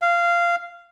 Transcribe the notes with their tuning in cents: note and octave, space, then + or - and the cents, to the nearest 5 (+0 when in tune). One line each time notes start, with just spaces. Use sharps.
F5 -15